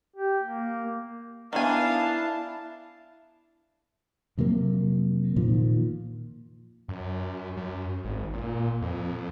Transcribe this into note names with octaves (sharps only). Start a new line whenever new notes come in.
G4
A#3
D#3 B3 D4 E4 F5 G#5 A5
F2 C3 F#3 A#3
A#2 D#3 F3
F#2
F#2
G#1
A#2
F2